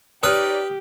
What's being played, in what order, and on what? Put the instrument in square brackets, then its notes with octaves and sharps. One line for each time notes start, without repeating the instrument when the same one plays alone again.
[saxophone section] D#4 C#5 D5 [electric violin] G4 [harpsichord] B4 [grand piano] D#6 F6